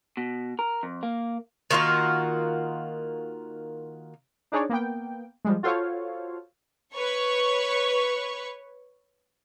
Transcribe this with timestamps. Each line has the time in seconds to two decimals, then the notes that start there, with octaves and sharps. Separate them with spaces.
0.17 B2
0.59 A#4
0.83 F2
1.03 A#3
1.71 D#3 A#3 F4 F#4
4.52 D4 D#4 G#4 C#5 D5
4.70 A#3 B3 G5
5.45 F3 G3 G#3
5.63 F4 F#4 A4 C5 C#5 F5
6.94 B4 C#5 C#6